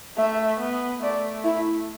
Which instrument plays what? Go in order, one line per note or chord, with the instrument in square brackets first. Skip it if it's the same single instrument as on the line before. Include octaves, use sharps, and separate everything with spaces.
[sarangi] A3 [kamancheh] E5
[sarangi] B3
[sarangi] A3 [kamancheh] D5
[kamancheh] E4